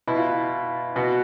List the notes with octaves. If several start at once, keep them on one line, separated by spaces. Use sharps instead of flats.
B2 E4
F4
E4
B2 F#4